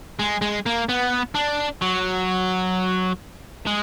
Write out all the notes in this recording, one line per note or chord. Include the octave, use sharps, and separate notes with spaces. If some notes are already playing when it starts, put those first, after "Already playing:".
G#3
G#3
A#3
B3
D4
F#3
G#3